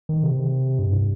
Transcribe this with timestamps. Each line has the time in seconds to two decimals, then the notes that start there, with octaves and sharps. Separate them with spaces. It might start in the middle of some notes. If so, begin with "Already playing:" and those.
0.09 D#3
0.23 C3
0.79 G2